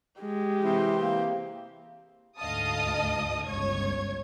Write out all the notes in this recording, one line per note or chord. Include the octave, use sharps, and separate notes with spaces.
G#3 G4
C3 E3 C4 E4
A#3
D2 G#2 D#5 F5 A5 D#6
G1 C#2 C#5 G#6